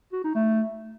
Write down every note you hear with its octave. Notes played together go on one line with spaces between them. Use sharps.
F#4
D#4
A3